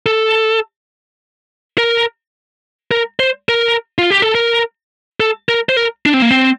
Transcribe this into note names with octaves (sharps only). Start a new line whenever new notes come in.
A4
A#4
A#4
C5
A#4
F4
G4
A4
A#4
A4
A#4
C5
A#4
D4
C4
A#3
C4